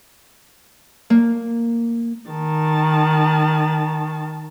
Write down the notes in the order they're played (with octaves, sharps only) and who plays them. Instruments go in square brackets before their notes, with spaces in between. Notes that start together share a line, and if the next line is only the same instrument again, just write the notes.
[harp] A#3
[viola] D#3 A5